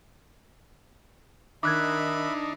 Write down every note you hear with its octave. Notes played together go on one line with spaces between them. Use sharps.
D#3 D4 D#4 E5 B5 D6 F#6 G#6